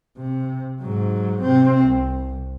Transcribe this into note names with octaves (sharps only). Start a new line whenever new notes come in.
C3
G#2 F#3
C3 C4
C2